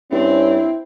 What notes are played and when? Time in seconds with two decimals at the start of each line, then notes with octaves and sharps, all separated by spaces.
0.12 G2 C4 C#4 E4